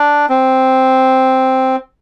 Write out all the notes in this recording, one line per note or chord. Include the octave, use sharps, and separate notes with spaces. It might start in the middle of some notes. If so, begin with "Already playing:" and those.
Already playing: D4
C4